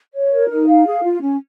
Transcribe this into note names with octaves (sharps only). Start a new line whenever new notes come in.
C#5
A#4
D#4
F5
G#4
F4
C#4